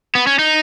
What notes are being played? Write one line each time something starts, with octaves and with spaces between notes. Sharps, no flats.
B3
C#4
D#4